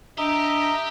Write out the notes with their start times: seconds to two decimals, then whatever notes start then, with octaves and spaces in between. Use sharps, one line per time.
0.18 D4 G4 D#5 E5 G5 A#5